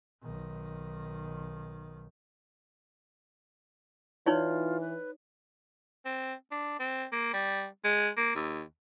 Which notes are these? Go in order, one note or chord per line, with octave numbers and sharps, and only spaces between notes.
B1 D#3
E3 D#4 F4 C#5 D5
B4
C4
D4
C4
A#3
G3
G#3
A#3
D#2